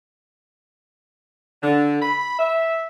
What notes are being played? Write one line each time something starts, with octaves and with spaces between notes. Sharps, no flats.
D3
B5
E5